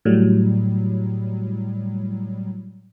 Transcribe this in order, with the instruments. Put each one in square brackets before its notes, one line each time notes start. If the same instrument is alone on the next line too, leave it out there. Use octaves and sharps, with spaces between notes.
[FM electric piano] A2 F#3 G3